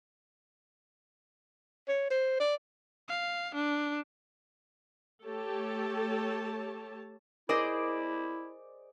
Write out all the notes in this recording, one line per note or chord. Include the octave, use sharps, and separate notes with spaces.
C#5
C5
D5
F5
D4
A3 G4 A4 C#5 A5
E4 G#4 A#4 C5 D5 D#5